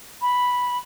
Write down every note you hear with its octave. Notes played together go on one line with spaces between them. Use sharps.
B5